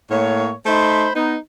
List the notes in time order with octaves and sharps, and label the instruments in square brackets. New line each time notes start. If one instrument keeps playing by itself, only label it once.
[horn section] A2 A#3 C#5
A3 D#4 C5 B5 C6
B3 D#4